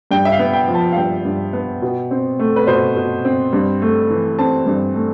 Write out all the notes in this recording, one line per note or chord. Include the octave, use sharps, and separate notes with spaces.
G2 G5
E5
F5
B3
G5
F3
A5
F5
G2 G5
G2
B3
B2
C4
A3
B4
B2 C5
B2
C4
G2
A3
E3
C4 A5
G2
A3